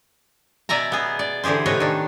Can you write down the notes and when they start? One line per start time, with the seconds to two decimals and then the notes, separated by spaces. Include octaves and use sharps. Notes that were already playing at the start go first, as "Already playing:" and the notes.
0.69 B2 D5 E5 G#5 A#5
0.92 B3 G#4
1.19 D5
1.44 D3 E3 G4 G#4 C5
1.66 A2 C3 B4 C#5 D#5
1.80 D#3 D4